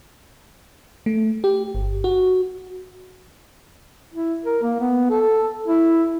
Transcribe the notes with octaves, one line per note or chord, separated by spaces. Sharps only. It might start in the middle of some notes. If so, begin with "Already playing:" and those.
A3
G4
G1
F#4
E4
A#4
A#3
B3
A4
E4